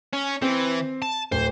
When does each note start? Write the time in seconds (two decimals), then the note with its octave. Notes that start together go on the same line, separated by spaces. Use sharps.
0.13 C#4
0.42 E3 C4
1.02 A5
1.32 D1 C5